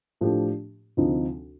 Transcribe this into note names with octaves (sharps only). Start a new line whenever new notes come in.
A2 F3 A3 D4 G4
D2 C3 F3 C4 D#4